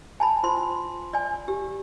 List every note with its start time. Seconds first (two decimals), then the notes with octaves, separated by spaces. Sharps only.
0.20 G#5 A5 B5
0.43 F4 C5 C6
1.13 D5 G#5
1.48 G4